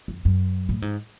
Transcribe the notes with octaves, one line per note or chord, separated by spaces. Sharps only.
F2
F#2
A2
G#2